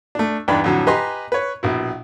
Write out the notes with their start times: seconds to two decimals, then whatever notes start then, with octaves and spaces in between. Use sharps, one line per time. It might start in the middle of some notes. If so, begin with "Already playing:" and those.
0.15 A3 D4
0.48 E2 G2 D4 D#4 G5 B5
0.64 F2 A2 D3 F#3
0.87 G4 B4 D#5 G#5 A#5 C6
1.32 B4 C#5
1.63 A#1 B2 E4